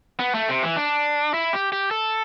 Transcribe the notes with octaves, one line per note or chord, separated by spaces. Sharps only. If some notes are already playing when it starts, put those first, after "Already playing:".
B3
A3
C3
E3
D4
E4
G4
G4
A4